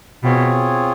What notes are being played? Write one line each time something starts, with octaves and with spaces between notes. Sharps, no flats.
B2 C4 F4 G#4 C#5